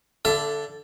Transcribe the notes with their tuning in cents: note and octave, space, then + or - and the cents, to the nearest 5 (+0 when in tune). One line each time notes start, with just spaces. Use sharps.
D3 -10 A4 +0 E5 +35